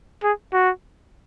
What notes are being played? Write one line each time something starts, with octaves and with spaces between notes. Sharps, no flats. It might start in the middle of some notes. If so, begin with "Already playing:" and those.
G#4
F#4